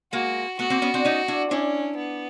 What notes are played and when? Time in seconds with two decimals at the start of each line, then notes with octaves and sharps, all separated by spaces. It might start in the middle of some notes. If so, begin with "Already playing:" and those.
0.13 G#3 A#3 F#4
0.59 A3 B3 F#4
0.70 A#3 C4
0.82 B3 C#4
0.94 C4 D4
1.05 C#4 D#4
1.28 D4 E4
1.51 C#4 D4 E4
1.97 B3